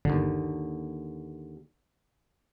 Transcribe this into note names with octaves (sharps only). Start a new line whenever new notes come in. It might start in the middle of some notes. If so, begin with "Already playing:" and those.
G1 D#2 D3